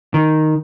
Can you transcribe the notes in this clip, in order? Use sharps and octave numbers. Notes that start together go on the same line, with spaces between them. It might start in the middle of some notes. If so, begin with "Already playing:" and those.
D#3